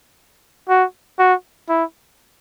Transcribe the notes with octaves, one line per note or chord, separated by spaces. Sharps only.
F#4
F#4
E4